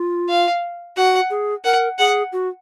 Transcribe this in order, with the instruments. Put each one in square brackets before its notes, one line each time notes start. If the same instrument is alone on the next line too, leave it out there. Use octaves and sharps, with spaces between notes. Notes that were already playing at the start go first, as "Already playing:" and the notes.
Already playing: [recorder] F4
[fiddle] F5
[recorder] F#4 [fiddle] F#5
[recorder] G#4
[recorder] A#4 [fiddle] F#5
[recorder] G#4 [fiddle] F#5
[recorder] F#4